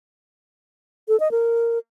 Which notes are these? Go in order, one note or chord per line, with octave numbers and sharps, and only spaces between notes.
A4
D#5
A#4